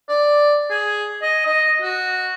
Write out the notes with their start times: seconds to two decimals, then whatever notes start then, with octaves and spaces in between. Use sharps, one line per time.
0.09 D5
0.70 G#4
1.22 D#5
1.46 D#5
1.82 F#4